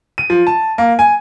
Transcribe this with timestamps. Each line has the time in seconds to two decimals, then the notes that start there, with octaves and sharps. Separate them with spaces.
0.18 D#7
0.30 F3
0.47 A5
0.78 A#3
0.99 G#5